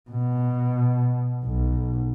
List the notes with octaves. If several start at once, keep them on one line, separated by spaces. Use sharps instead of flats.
B2
B1